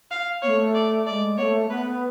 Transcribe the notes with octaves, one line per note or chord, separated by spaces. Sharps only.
F5
B3 C#5
A3
D5
G#3 A3 D5
A3 B3 C#5
B3 B4